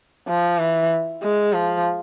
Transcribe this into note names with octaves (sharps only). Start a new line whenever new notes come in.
F3
E3
G#3
F3